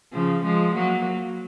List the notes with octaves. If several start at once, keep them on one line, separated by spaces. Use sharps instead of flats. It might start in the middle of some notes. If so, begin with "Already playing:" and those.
C#3 F3
F3 G#3
F#3 A#3